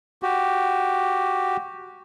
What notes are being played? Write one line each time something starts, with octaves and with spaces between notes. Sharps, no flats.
F#4 G4